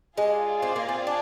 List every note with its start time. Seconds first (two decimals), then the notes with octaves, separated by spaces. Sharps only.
0.17 G#3 F4 G#4 D5
0.62 C4
0.76 A#3
0.89 C4
1.07 D4